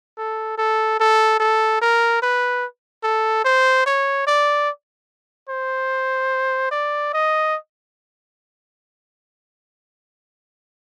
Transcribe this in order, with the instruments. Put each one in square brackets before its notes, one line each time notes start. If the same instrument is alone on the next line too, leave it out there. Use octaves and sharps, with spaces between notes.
[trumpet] A4
A4
A4
A4
A#4
B4
A4
C5
C#5
D5
C5
D5
D#5